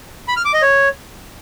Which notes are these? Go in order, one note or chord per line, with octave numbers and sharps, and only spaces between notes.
B5
F6
D6
D#5
C#5